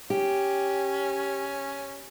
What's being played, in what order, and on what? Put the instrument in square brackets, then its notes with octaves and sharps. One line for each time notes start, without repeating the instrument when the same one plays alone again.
[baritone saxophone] C#4 [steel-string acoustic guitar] G4